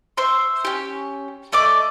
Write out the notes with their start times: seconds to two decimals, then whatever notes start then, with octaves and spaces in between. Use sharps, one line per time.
0.17 C5 E5 C6
0.65 C#4 G4
1.52 A3 D5 D#5 D6